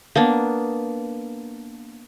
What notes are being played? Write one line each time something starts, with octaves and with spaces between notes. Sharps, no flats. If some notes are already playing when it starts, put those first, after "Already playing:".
A#3 B3 D4